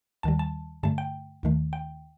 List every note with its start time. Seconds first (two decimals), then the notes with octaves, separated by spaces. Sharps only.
0.23 D#2 D#3 G3 A5
0.39 A5
0.83 G2 D3 A3 A5
0.98 G5
1.43 D#2 D#3 A3
1.73 G5